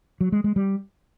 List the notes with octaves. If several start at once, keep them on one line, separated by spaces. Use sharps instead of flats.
F#3
G#3
G#3
G3